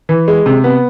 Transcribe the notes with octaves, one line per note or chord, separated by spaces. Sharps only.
E3
G#3
C3
B3